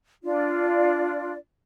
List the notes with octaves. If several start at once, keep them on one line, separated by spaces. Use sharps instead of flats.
D4 F4 D5